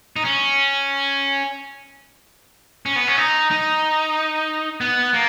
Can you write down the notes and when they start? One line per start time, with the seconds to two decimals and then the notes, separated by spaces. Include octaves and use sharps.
0.16 D#4
0.25 C#4
2.86 C#4
2.96 B3
3.07 C#4
3.17 D#4
3.51 D#4
4.81 B3
5.14 A#3